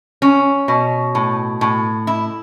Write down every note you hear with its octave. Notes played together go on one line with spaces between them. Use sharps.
C#4
B2
A2
A2
E4